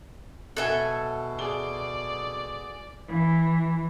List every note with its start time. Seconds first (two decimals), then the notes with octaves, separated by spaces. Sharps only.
0.57 B2 A4 E5 G#5 F#6
1.39 G#4 D5 G7
3.07 E3